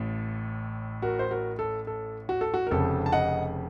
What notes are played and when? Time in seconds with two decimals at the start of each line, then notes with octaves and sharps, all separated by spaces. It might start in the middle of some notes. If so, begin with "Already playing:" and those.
Already playing: A1 A2
1.02 F#4 A#4
1.19 C5
1.31 F#4 A#4
1.59 A4
1.87 A4
2.29 F#4
2.41 A4
2.54 F#4
2.67 A#4
2.71 F1 F2 C#3 A4
3.06 A5
3.12 D#5 F#5